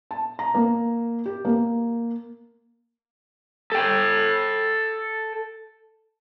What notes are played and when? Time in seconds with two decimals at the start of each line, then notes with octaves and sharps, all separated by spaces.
0.11 A5
0.39 A#5
0.55 A#3
1.26 G4
1.45 A#3
3.72 A4 G5